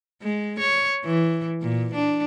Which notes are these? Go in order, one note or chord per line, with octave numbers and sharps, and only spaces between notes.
G#3
C#5
E3
A#2
D4